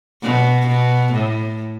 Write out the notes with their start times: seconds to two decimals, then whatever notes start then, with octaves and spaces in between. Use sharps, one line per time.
0.23 B2
0.67 B2
1.13 A2